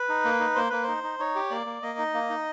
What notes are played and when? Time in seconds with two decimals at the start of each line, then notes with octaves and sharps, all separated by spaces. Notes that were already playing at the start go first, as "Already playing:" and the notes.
Already playing: B4
0.09 D#4
0.25 A#3
0.40 D#4
0.55 A#3 C5
0.70 A#3 B4
0.83 D#4 C5
1.04 D#4
1.19 D#4 C#5
1.35 G4
1.50 A#3 D5
1.66 A#3
1.82 A#3 D#5
1.98 D#4
2.14 A#3
2.30 D#4